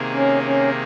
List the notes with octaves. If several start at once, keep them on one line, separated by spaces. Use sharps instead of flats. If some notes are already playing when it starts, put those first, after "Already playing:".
Already playing: C3 D#3 A#3 D#4 G#4
C#4
C#4